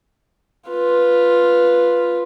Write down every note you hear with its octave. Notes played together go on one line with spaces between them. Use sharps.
F4 B4